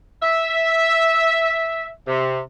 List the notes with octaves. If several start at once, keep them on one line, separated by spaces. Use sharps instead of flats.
E5
C3